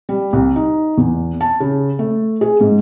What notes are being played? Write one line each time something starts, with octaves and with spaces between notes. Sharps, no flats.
G3
C2
D#4
E2
A5
C#3
A3
G#4
G#2